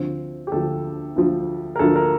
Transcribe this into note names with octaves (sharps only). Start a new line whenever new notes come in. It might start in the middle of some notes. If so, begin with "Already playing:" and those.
Already playing: D2 D3 F3 C4
G4
D2 D3 F3 A4
D2 D3 F3
A#4
D2 D3 F3 A4
A#4